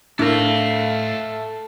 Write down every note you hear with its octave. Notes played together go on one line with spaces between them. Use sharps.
A2 A3 D4 E4 A4 A#4 F5